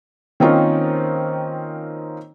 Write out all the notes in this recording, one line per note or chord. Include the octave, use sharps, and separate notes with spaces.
D#3 A#3 C4 C#4 D#4 F4